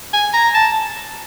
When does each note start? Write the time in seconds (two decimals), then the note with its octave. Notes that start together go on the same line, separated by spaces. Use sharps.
0.14 G#5
0.33 A#5
0.54 A5